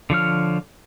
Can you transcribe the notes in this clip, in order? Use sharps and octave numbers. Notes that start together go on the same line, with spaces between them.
D3 F3 C#5 F6